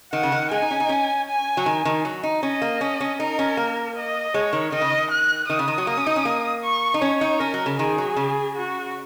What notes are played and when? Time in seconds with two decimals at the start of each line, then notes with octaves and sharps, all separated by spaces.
0.13 D#3 F#5
0.23 C#3
0.32 D#3
0.51 G#3 G#5
0.62 D#4
0.71 C#4
0.80 D#4
0.89 C#4
1.28 G#5
1.57 F#3
1.66 D#3
1.85 D#3
2.05 F#3
2.23 D#4
2.43 C#4 D#5
2.62 A#3
2.81 C#4
3.00 C#4
3.19 D#4 A#4
3.39 C#4
3.57 A#3
3.96 D#5
4.34 G#3 C#5
4.53 D#3
4.72 D#3 D#5
4.81 C#3
4.90 D#3
5.11 F#6
5.49 D#3 D#6
5.59 C#3
5.68 D#3
5.78 F#3
5.87 A#3
5.97 C#4
6.07 D#4
6.16 C#4
6.25 A#3
6.64 C#6
6.94 D#4
7.02 C#4 C#5
7.21 D#4
7.40 C#4 A#4
7.54 F#3
7.66 C#3
7.78 D#3 G#4
7.98 F#3
8.16 C#3
8.55 F#4